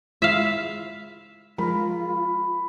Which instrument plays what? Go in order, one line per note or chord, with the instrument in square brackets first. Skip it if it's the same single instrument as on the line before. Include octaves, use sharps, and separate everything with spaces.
[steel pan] G#3 E4 F4 [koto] E5 F5
[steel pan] F3 G#3 A#4 [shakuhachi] F4 [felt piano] B5